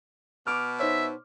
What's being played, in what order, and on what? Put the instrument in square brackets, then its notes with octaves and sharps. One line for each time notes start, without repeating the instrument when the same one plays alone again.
[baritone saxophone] B2 [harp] D6 F6
[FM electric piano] D#4 C5 C#5 [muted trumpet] E5